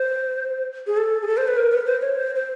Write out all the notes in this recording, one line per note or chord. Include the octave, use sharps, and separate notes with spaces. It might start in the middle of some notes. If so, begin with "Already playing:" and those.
Already playing: C5
G#4
A4
G#4
A4
C5
B4
A#4
B4
C5
C#5
C5
C5